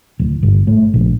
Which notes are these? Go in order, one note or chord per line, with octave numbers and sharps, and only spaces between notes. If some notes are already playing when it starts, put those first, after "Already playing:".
D1
G1
A2
A#1